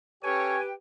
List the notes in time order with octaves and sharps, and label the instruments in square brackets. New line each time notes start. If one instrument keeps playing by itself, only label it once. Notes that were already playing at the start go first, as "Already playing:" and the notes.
[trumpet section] C#4 A4 C#5 [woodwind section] G4 B4 G5 [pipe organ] G#5